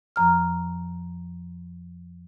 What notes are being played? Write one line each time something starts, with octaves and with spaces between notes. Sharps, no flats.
F2 F3 A#5 F6